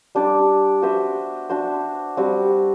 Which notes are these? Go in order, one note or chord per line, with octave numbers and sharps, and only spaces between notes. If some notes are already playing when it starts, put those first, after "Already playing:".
G3 D4 G4 D5
B3 F#4 C5 E5
D4 F#4 C5
G3 C4 F#4